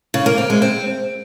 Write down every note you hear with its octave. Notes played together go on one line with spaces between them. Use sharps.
C#3
A#3
C4
G#3
C4